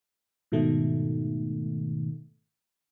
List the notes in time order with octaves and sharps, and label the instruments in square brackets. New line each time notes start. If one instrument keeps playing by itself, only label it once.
[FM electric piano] G#2 B2 D#3 A3